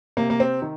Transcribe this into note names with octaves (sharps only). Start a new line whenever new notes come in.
C3 A#3
A#3
C4
D#3